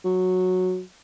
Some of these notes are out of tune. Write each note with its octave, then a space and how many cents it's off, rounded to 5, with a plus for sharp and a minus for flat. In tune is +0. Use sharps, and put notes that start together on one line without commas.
F#3 -10